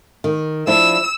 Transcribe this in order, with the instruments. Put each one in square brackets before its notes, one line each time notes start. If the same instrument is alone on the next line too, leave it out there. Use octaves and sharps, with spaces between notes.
[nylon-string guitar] D#3
[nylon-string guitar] F3 D4 E4 [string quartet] E6